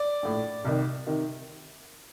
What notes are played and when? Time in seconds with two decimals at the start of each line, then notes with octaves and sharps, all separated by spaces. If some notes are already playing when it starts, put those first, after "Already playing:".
Already playing: D5
0.23 A#1 A2
0.65 C2 C3 D#3
1.06 C3 D#3